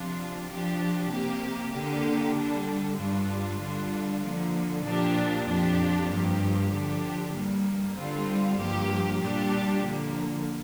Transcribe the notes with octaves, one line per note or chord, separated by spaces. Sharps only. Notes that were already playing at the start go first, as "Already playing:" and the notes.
Already playing: C3 F3 D4 F4
F3 D4 G4
C3 A#3 G4
D3 A#3 G4
D3 G3 D4
G2 G3 D4 F4
D3 G3 D4 F4
D3 F3 A#3
A#2 F3 A#3 D4 G4
F2 F3 D4 G4
G2 F3 A#3 G4
D3 F3 D4 G4
G2 G3 A#3
D3 G3 C4 F4
G2 F3 A#3 G4
A#2 G3 D4 G4
D3 F3 A#3